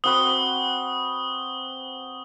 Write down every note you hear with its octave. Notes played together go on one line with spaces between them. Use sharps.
C4 F#4 B4 D#6 G7